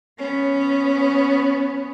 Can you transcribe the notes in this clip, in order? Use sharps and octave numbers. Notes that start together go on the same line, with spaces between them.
B3 C#4